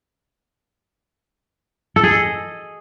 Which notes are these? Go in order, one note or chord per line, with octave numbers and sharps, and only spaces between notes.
A4
G#4
D#5